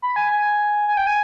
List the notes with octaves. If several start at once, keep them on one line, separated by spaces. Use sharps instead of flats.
B5
G#5
G#5
G#5
G5
G#5